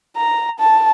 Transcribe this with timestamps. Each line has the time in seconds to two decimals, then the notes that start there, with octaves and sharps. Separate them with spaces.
0.17 A#5
0.59 A5